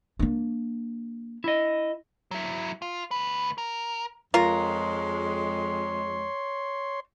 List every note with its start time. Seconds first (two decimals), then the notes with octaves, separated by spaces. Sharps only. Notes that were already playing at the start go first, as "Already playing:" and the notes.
0.19 A#3 D4
1.44 E4 D#5
2.31 F#3 E4
2.82 F4
3.11 D2 B4
3.58 A#4
4.34 F2 G#3 F4 A#4 C#5 C6